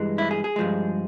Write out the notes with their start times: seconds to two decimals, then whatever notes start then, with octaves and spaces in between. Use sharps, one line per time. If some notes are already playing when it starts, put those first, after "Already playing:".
Already playing: G2 E3 G#3
0.18 E4
0.31 G#4
0.44 G#4
0.56 G2 F3 G#3